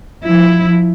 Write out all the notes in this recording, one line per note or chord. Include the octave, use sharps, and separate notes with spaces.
F3 E4